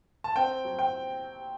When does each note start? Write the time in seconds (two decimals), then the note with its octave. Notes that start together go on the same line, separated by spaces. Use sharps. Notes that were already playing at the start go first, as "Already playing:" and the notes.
0.24 A5
0.36 C4 G5
0.65 F#3
0.79 G5